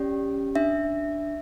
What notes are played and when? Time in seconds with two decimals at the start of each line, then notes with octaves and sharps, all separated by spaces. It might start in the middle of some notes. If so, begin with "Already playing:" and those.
Already playing: C#4 G4 D5
0.55 D4 E5